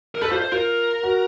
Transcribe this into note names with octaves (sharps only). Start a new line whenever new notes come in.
A#4
A4 B4
F4 C5
C5
F4 A#4
F#4